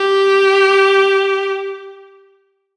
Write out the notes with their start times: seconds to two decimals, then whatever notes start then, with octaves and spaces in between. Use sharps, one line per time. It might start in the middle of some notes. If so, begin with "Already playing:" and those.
Already playing: G4